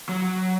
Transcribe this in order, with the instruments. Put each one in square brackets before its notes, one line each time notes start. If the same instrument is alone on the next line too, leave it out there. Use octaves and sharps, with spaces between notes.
[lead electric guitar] F#3